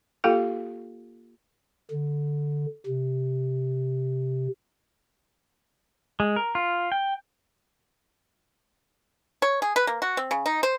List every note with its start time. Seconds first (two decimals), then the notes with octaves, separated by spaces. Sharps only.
0.24 A#3 F4 G4 A4 F5 G5
1.91 D3
2.86 C3
6.20 G#3
6.36 A#4
6.55 F4
6.92 G5
9.42 C#5
9.62 G#4
9.76 B4
9.87 A#3
10.02 F#4
10.17 C4
10.31 C#3
10.46 D#4
10.63 C5